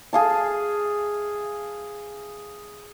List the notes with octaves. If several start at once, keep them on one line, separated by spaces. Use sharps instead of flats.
G#4 F5 A5